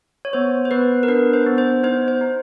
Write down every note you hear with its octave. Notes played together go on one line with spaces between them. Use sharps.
C#5
B3 C5
C5
B3 B4
A#4
D4 B4
C5
B3
C5
D#4 C5
C5
D#4